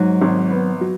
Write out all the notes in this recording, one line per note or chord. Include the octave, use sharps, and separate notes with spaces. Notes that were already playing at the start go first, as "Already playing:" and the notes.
Already playing: G#2 F#3
G#1
B3
F#3